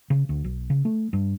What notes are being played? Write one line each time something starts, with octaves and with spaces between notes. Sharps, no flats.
C#3
D2
B1
C#3
A3
G2